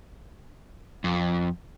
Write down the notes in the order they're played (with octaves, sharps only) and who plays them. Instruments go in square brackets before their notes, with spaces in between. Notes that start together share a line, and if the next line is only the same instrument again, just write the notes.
[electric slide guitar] F2